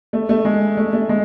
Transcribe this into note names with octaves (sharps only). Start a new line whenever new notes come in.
A3
A3
G#3
A3
A3
G#3